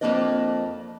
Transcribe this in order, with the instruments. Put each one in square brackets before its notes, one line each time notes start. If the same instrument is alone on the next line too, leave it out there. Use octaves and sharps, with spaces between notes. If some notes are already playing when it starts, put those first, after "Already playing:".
[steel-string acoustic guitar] F2 D3 A#3 D4 D5 D#5